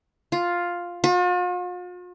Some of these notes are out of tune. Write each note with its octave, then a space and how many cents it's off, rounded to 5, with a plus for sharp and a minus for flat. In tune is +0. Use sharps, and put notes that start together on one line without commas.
F4 +5
F4 +45